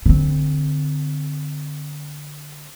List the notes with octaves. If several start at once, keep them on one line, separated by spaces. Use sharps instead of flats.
D3 C4